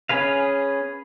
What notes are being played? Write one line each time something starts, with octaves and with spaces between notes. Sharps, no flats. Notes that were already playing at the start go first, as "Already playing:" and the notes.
C#4 G#4 B4 F5